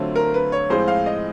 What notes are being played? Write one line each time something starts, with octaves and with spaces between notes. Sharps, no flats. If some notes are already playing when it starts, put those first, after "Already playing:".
Already playing: D3 F#3 A3 C4 F4
A#4
B4
C#5
A2 F3 G#3 C4 F4 C5
F5
D#5